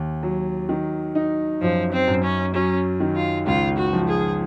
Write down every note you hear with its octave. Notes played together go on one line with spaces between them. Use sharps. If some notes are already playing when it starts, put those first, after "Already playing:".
Already playing: D#2
F#3
D#3
D#4
F#2 F3
C4
F#2
C#4
F#3 C#4
D#3
F4
C#2 F4
F#4
F3
G#4